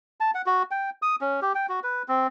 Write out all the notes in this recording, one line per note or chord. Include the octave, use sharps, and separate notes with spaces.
A5
F#5
F#4
G5
D#6
C#4
G4
G5
F#4
B4
C4